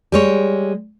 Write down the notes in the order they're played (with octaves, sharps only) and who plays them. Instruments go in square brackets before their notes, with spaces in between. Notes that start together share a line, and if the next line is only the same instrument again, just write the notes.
[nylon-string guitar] G3 G#3 C#5